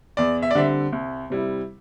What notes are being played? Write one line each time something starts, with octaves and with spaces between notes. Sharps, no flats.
E2 D5
E5
D5
D3 G3 C4 E5
C2
C3 G3 E4